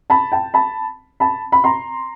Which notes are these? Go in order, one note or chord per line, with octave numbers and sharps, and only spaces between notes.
A5 B5
G5 A5
A5 B5
A5 B5
B5
A#5 C6